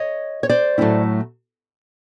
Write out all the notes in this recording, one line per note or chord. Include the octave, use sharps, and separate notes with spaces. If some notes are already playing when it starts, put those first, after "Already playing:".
Already playing: C#5 D#5
C#5
C5 D5
A2 F#3 A3 C#4 E4